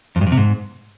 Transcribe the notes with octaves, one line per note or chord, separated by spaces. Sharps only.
F2
G2
F2
C3
G#2